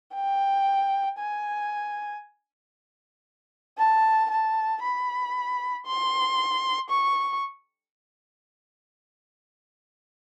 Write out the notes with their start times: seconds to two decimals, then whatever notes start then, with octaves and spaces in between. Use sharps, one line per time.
0.15 G5
1.19 G#5
3.78 A5
4.30 A5
4.82 B5
5.86 C6
6.90 C#6